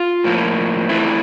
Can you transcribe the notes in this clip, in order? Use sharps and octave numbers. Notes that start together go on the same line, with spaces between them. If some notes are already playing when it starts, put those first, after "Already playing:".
Already playing: F4
A2 F3 A#3
E2 E3 A3 C4 E4